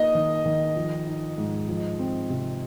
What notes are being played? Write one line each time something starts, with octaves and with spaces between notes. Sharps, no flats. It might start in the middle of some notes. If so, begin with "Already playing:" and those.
Already playing: A#3 D#5
D#3
D#3
F3
D#4
G#2
F3
C4
C3